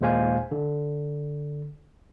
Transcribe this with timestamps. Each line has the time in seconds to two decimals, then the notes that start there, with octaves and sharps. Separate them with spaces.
0.01 D#2 A#2 G#3 C5 F5 G#5
0.51 D3